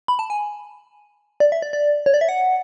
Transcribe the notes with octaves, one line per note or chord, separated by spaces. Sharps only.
B5
A5
G#5
D5
E5
D5
D5
C#5
D5
E5
F#5